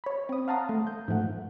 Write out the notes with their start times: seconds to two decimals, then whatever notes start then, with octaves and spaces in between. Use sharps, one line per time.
0.04 C#5 B5
0.29 C4 D#6
0.48 F5 F#5 A5 A#5 C6 D#6
0.69 A3
0.87 G6
1.08 G#2 F3 A3 F#5